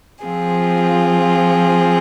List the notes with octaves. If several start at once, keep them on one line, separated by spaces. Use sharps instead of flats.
F3 C4 F4 G#4